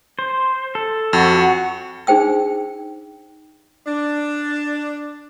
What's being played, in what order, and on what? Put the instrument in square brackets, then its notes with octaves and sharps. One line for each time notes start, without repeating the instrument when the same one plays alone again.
[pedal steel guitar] C5
A4
[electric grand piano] F2 [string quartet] F#4
[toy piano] D4 D#4 G#4 C5 G5 E6
[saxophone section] D4